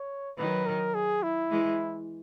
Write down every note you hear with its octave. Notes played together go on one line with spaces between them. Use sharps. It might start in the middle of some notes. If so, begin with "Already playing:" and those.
Already playing: C#5
D#3 F#3 B4
A#4
G#4
E4
E3 G#3